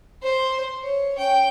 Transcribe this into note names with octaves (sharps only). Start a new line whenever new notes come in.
C5
C#5
C#4 G5